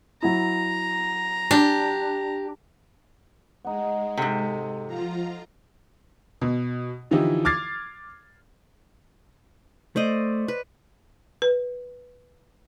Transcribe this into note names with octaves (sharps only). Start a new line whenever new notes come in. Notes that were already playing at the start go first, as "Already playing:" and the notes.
F#3 E4 A#5
D4 G4
G#3 D#4 F#5
G#2 C3 A4
F3 F4 A#5
B2
D3 E3 F3 D#4 E4 G4
D6 F6 G#6 A6 C7
A3 C5 D5 D#5
B4
B4